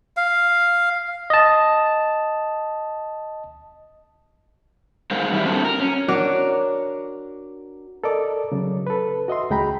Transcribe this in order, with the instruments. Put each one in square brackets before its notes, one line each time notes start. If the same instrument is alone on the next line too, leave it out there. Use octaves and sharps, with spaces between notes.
[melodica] F5
[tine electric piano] D#5 A5
[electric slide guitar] B2 G#3 D#4 A#4 C5 F5
D#3 G3 E4
A#3 C4 D4 F#4 A4
A#4
C#4
[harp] D4 F#4 A#4 C#5 D6
[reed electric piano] A4 A#4 D5 D#5 D6
C#3 F#3
A4 B4
F#4 D#5 E5 C6
C#2 G#3 G5 A#5 B5